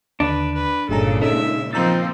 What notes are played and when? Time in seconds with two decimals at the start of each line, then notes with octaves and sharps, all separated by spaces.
0.20 D#2 D3 D4 B4
0.54 B4
0.89 G1 G2 A#2 C#3 G#3 A4 A#5
1.22 C#4 D#4 A4 E5
1.73 F3 A#3 C4 D#4 A#5 E6 A6